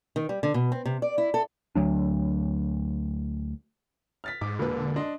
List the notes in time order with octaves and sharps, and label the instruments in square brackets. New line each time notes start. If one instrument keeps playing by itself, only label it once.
[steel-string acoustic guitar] D#3
G3
D3
B2
C4
C3
D5
E4
A4
[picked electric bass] D2 F#3 D4
[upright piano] F6 A6 B6
[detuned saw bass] G#2 [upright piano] D6
[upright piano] E1 A#2 B4 [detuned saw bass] D3
[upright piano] D4 D#5 C6